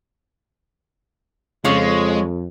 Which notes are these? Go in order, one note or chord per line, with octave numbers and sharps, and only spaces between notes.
F2 C#3 G#3 F4 C#5